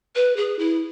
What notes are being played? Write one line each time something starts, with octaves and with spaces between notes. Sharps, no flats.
B4
G#4
E4